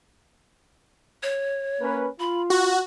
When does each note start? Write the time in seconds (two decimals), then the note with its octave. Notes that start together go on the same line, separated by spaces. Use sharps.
1.23 C#5
1.81 A#3 C#4 B4
2.20 F4 B5
2.50 F#4 C#6